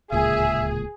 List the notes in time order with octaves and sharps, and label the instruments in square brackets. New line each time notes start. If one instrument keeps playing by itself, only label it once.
[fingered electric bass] D1 C#2 A#2 [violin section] G#4 [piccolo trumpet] E5